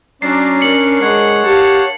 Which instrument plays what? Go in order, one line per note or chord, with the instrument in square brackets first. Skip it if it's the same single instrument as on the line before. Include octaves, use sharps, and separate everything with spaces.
[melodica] F#3 D5 A#5 [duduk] C#4 [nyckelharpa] D4 [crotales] C7
[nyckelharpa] D4 A#4 [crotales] C7 C#7 F#7
[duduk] G#3 [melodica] C#5 F#5
[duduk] G4 [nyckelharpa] F5 A5